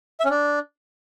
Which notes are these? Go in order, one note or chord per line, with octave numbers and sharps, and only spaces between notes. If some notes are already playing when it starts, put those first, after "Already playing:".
E5
C#4
D4